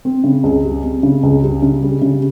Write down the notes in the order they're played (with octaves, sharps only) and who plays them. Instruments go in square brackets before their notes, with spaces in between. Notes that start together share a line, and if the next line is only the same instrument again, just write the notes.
[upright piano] C4
C#3
C#2
G3
C4
C#3
C#2
G3
C#3
G3
C#3